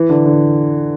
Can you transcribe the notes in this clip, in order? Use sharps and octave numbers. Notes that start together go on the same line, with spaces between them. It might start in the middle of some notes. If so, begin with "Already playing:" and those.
Already playing: E3
D3
D3